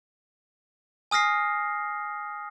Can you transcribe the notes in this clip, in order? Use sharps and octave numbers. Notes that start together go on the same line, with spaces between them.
G#5 D#6 F6 A#6 C7